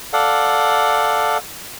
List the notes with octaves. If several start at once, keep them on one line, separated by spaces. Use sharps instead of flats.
A4 D5 F5 F#5